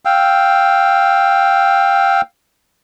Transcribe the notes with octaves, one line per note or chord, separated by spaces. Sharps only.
F5 G5 E6